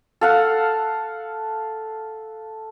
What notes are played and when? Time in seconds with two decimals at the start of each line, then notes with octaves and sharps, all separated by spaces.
0.21 A4 F5 F#5